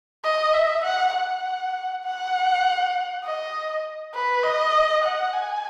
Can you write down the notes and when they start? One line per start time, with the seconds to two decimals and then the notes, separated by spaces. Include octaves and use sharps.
0.24 D#5
0.53 E5
0.84 F#5
1.14 F#5
2.04 F#5
3.24 D#5
4.14 B4
4.43 D#5
5.04 F#5
5.34 G#5